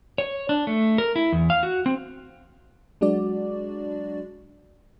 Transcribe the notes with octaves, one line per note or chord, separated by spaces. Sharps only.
C#5
D4
A3
A#4
E4
E2
F5
F#4
C4
F#3 G#3 D4 F#4 D5